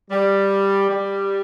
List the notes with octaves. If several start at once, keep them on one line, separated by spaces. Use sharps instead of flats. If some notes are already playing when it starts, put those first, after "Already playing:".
G3
G3